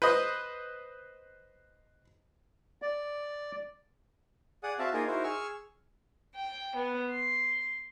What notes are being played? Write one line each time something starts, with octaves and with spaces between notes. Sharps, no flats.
B4 C5 D#5
D5
G#4 D5 F#5 D#6
C4 F#4 E5 F5 A5
A#3 D#4 F4 G#4 A#4
D#4 E4 F#4 A#4 C5
G#4 C#6 E6 F6
G5
B3
C6